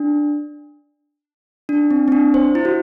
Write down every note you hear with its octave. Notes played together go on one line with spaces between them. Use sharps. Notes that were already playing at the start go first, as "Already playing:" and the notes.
Already playing: D4
D4
C4
C4
D4
C5
E4
F#4